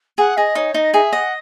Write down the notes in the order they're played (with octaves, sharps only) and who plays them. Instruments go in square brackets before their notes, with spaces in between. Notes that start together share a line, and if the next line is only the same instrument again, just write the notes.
[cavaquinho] G#4 [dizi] F#5
[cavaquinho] G#4 [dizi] D#5
[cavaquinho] D#4 [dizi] C#5
[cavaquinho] D#4 [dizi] D#5
[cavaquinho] G#4 [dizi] E5
[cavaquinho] D#5 [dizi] F#5